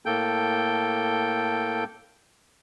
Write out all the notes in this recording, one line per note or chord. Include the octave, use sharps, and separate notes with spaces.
A2 A#3 A4 G5 G6